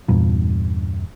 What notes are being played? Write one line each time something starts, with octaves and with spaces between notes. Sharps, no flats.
E2 G2 A#2